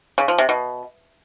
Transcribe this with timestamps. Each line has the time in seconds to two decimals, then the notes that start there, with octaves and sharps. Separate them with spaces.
0.18 C#3
0.28 F3
0.38 C3
0.49 B2